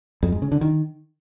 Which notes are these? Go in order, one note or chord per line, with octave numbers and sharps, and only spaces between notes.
F2
G#2
C#3
D3
D#3